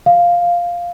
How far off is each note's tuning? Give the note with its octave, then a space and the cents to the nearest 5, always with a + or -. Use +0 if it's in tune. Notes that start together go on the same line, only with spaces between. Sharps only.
F5 +0